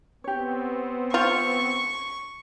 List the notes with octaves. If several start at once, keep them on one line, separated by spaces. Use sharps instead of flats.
B3 C4 G4 C#5
F4 C5 C#6